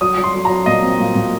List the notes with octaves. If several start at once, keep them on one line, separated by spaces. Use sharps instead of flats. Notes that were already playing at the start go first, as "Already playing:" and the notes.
F#3 D#6
F#3
C6
F#3
A#5
F#3
A#2 D#5
C4
A#2
A#2